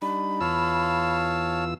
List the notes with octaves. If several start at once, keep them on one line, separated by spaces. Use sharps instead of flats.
G3 D4 D#4 B5
E2 F4 C#5 F5 A5 E6